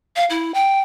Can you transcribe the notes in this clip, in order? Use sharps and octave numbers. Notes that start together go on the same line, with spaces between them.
F5
E4
G5